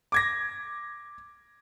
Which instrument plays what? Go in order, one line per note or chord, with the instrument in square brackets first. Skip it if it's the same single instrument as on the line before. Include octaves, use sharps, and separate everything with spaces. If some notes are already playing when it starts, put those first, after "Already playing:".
[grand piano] D6 G#6 A#6